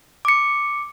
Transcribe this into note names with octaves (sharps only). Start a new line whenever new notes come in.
D6 C#7